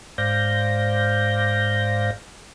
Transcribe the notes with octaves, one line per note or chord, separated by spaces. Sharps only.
G#2 C5 D5 F5 G6 A#6